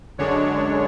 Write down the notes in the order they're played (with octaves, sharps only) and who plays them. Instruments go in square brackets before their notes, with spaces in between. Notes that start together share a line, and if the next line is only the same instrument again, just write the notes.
[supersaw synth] F#2 D3 G#3 D4 C#5